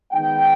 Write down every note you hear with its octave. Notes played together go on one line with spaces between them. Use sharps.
D#3 G#3 B3 D#4 G5